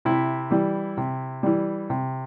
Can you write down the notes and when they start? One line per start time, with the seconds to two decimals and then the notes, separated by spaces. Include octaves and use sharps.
0.05 C3 E4
0.51 E3 G3
0.97 C3
1.43 E3 G3
1.90 C3